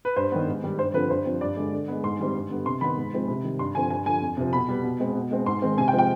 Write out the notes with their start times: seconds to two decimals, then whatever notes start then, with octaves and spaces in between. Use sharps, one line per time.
0.05 B4
0.16 G2 C5
0.32 D#3 G3 B3
0.47 G#2
0.63 D#3 G3
0.79 G2 C5
0.94 D3 F3 C4 B4
1.10 G2 C5
1.25 F3 C4
1.41 G2 D5
1.56 D3 G#3
1.73 D3
1.88 G#3 B3
2.04 G#2 C6
2.19 D#3 G3 C4
2.35 G2
2.50 D3 G3 B3
2.66 C3 C6
2.81 D#3 B3 B5
2.97 G#2
3.13 F3 G#3 C4
3.28 C3
3.44 D#3 G3
3.59 G2 C6
3.75 D3 F3 C4 G#5
3.90 G2 G#5
4.06 D3 F3 G#5
4.22 F2
4.37 C3 F3
4.53 B2 B5
4.68 G3 B3
4.84 B2
5.00 G#3 C4
5.15 B2
5.31 G#3 C4
5.46 G#2 C6
5.62 D#3 G#3 C4
5.78 C3 G#5
5.88 G5
5.93 F3 G#3 C4
5.98 G5